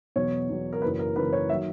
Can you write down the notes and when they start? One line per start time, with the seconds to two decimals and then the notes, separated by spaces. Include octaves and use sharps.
0.16 E2 B2 F#3 C#5
0.49 E2 B2 F#3
0.73 A#4
0.82 F#1 F#2 E3 B4
0.99 A#4
1.16 F#1 F#2 E3 B4
1.33 C#5
1.49 D#3 F#3 E5